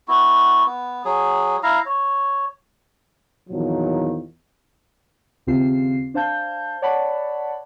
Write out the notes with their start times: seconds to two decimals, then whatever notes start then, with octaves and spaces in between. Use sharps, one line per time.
0.08 B3 E4 F#4
0.66 B3
1.05 F#3 G#4
1.63 E4 F5 A#5
1.86 C#5
3.49 E2 A#2 D#3 F3 F#3
5.47 D#2 C#3 C4 F4 G4 C7
6.14 D4 C5 F5 A5 G6
6.82 C#5 D5 F#5 A5 B5